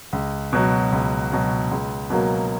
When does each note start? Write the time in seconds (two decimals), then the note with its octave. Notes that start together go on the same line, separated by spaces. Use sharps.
0.13 C#2
0.53 B2 F#3
0.92 C#2
1.32 B2 F#3
1.71 C#2
2.10 B2 F#3 A#3